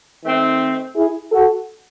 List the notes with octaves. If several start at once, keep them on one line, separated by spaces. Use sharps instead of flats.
D#3 A3 C4 D#4
E4 G#4
F#4 A4